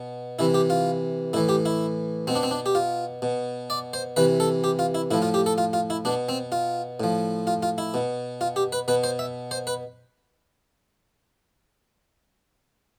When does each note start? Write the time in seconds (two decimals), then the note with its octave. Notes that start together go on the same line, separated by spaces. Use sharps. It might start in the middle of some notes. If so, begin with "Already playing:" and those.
Already playing: B2
0.39 C3 E3 E4
0.54 G4
0.70 F4
1.33 A2 E4
1.37 E3
1.49 G4
1.65 E4
2.27 B2 C4
2.35 D4
2.43 C4
2.51 D4
2.66 G4
2.75 F4
3.22 B2
3.70 D5
3.93 C5
4.16 C3 E3 B4
4.40 A4
4.64 G4
4.79 F4
4.95 E4
5.11 A2 E4
5.14 F3
5.22 F4
5.34 G4
5.46 A4
5.58 F4
5.73 F4
5.90 E4
6.05 B2 D4
6.29 C4
6.52 F4
7.00 A2 F3
7.47 F4
7.63 F4
7.78 E4
7.94 B2
8.41 F4
8.56 G4
8.72 B4
8.88 B2 B4
9.04 C5
9.19 E5
9.51 C5
9.67 B4